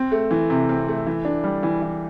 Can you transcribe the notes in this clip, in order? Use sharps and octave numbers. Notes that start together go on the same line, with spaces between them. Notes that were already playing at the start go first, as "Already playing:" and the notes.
Already playing: C4
A3
E3
C3
C4
A3
E3
D4
G3
E3
E3